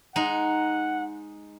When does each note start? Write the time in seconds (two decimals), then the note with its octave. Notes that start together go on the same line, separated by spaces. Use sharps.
0.16 G#3 D#4 F#5